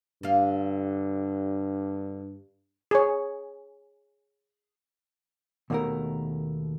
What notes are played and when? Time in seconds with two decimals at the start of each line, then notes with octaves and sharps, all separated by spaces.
0.23 G2 D3 F5
2.91 G#4 C#5
5.70 D#2 B2 D#3 G#3 A3 A#4